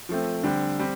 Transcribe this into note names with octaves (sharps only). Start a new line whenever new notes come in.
F3 A3 C4
D3 G3 C4
G3 C4